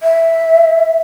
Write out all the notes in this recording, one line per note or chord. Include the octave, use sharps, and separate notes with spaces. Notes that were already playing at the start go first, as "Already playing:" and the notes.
E5